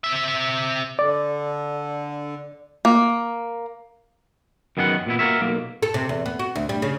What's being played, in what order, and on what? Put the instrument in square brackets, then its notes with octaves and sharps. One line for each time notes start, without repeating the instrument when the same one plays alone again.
[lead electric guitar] C4 E5
[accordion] D3 [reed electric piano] D5
[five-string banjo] A#3
[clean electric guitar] F#2 D#3 B3 G#4 C#5 F#5
A#2 B3 E4
A#3 F#4 G#4 A#4 C#5 E5
B1 A#3
[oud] A4
C3
E2
B3
F#4
D2
G3
C#3